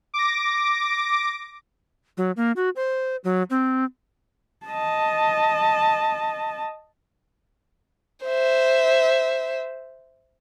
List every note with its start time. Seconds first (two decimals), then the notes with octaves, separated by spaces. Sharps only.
0.14 D6 A#6
2.17 F#3
2.37 A#3
2.56 F#4
2.76 C5
3.24 F#3
3.50 C4
4.66 D#5 A5
8.26 C5 E5